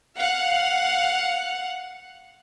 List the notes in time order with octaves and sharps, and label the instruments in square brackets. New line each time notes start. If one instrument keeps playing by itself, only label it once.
[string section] F5 F#5